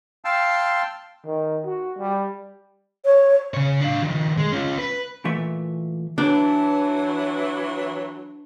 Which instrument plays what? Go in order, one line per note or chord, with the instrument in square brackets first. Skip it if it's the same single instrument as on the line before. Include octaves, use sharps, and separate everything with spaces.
[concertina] F5 G5 A5 C6 E6
[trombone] D#3
F#4
G3
[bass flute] C#5
[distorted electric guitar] C#3 C#5
D4 F5
D#3 F3
G#3
C#4 F4
B4
[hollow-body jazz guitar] A#2 E3 A3 E5
[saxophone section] E3 F#3 [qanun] D4